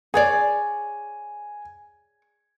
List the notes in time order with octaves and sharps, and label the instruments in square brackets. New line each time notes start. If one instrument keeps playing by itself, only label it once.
[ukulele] G#4 C#5 D5 [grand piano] G#5